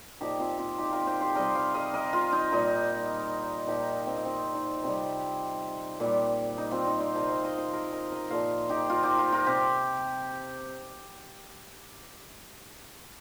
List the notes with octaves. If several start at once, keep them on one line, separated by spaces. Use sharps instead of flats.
A#2 F3 D#4 G4
C4 F4
C4 F4
D#4 G4
F4 A#4
G4 C5
G4 C5
C3 G3 A#4 D#5
C5 F5
A#4 D#5
A#4 D#5
F4 A#4
D#4
A#2 G3 D#4
A#2 F3 D#4 G4
C4
D#4
C4 F4
D#4
C3 G3 C4
A#2 G3
D#4
C4 F4
D#4
C5 F5
C3 F3 A#4 D#5
C5 F5
A#4 D#5
C5 F5
A#4 D#5
A#4 D#5
A#4 D#5
A#2 F3 C5 F5
D#4 G4
F4 A#4
D#4 G4
F4 A#4
F4 A#4
C3 G4